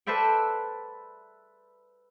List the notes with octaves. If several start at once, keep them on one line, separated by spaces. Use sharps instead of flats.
A4 B4 C5 D5 E5 G5